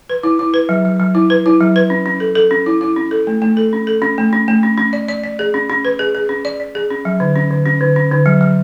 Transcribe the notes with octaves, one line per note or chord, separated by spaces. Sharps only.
B4
E4
E4
B4
F#3
F#3
F#3
E4
B4
E4
F#3
B4
C#4
C#4
A4
A4
C#4
E4
E4
C#4
A4
A3
A3
A4
C#4
A4
C#4
A3
C#4
A3
C#4
C#4
D5
D5
D5
G#4
C#4
C#4
B4
G#4
G#4
C#4
D5
D5
G#4
C#4
F#3
D3
C#4
D3
C#4
D3
C#4
D3
F#3
F#3